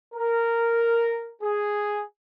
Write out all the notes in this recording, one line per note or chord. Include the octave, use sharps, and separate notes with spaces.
A#4
G#4